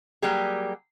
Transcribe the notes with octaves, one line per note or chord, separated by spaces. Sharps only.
F#3 G3 A#3 G4 G#4